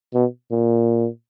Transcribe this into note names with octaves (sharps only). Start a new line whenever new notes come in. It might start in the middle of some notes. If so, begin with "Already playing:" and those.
B2
A#2